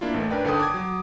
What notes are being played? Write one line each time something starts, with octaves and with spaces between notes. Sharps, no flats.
A#3 D4 E4 F4
A1 A3
C#4 D4 A#4 B4 D5 G5
G1 D3 D#3 G5 A5 D#6
D6 D#6 G#6
F#3